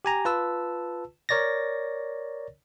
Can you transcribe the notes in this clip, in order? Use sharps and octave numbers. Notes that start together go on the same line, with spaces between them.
G4 G#5 A#5
F4 B4 A5 E6
A#4 C#5 D5 A6 A#6